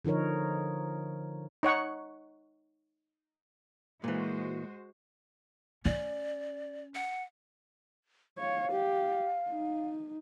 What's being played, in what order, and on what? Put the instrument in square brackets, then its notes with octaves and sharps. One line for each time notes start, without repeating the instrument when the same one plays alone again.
[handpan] D3 F3 D#4 A#4 C#5
[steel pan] D#4 C#5 F#5 C#6
[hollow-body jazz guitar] A#2 E3 [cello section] G#3 F#4 C5
[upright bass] C#4 [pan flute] D5
[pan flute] F#5
[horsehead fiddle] C#5 [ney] F5
[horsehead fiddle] G4
D#4